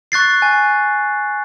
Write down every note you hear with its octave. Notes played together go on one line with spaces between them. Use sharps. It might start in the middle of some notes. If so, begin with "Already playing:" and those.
C#6 F#6 A6 C7
G#5